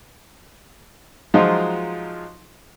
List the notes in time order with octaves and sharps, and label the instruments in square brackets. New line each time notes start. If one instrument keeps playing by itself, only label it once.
[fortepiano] F3 F#3 G#3 D#4 F4